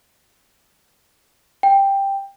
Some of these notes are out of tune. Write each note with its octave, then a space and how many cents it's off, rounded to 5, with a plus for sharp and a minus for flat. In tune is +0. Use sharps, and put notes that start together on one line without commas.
G5 +5